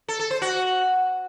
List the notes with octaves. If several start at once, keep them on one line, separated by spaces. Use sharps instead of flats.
A4
A4
C5
F#4